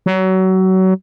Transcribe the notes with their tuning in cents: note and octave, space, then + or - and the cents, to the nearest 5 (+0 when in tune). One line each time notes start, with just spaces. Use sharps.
F#3 +25